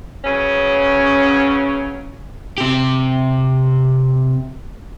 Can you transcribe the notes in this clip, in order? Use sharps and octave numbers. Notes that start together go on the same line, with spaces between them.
C#3 F#3 B3 C#4
C3 G4